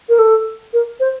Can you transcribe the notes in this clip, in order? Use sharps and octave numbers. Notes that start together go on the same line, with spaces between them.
A#4
A4
A#4
C5